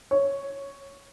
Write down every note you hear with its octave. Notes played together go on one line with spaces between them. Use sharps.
C#5